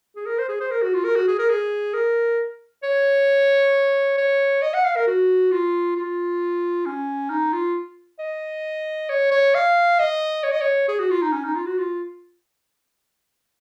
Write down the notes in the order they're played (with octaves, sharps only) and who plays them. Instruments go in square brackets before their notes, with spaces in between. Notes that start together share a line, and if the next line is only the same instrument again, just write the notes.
[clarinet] G#4
A#4
C5
G#4
C5
A#4
F#4
F4
A#4
F#4
G#4
A#4
G#4
A#4
C#5
C#5
D#5
F#5
F5
A#4
F#4
F4
F4
C#4
D#4
F4
D#5
C#5
C#5
F5
D#5
C#5
D#5
C#5
G#4
F#4
F4
D#4
C#4
D#4
F4
F#4
F4